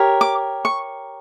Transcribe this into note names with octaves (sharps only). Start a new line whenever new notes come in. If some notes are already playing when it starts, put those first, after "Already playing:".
Already playing: G4 A#4 C#5
D6
C#6